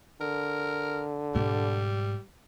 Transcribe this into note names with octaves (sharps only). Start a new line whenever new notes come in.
D3 A#4
G#2 B2 G3